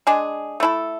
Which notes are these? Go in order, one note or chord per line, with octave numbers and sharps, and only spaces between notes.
G#3 D4 G#4
A3 E4 A4